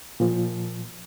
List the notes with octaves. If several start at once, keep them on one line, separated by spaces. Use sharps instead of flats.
A#2 F3